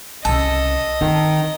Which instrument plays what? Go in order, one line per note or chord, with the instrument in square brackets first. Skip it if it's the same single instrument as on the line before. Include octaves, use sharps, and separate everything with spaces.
[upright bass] C2 C#3 [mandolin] A4 [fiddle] D#5
[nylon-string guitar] D#3 [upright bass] C4